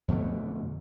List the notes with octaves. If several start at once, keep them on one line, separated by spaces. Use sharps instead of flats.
F2 B2 D3 A3